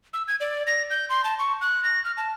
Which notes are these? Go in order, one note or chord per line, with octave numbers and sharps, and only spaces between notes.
E6
G#6
D5
A#6
G6
C6
A5
C#6
F#6
A#6
F6
A5